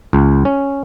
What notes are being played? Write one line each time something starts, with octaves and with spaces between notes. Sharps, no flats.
C#2
C#4